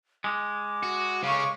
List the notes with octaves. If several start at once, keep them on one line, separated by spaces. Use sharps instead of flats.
G#3 D6
F#4
C#3 C#4 F5 C#6